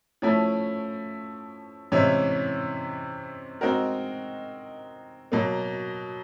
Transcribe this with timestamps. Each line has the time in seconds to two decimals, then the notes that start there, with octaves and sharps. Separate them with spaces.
0.22 F3 A3 C#4 E4
1.92 C3 E3 G#3 C#4 E4
3.61 G#3 C4 D#4 F#4 A#4
5.32 B2 F#3 A#3